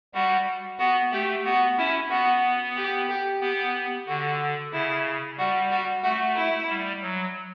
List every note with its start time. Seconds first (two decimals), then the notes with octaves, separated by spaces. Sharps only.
0.14 G3 F#4
0.79 B3 F#4
1.12 A3 G4
1.45 B3 F#4
1.77 C#4 E4
2.10 B3 F#4
2.77 G4
3.09 G4
3.41 B3 G4
4.08 D3 F#4
4.72 C#3 E4
5.38 G3 F#4
5.71 F#4
6.03 A3 F#4
6.36 E4
6.70 G3
7.02 F#3